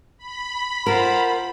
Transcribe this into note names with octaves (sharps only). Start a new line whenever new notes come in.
B5
F4 A#4 C5 F#5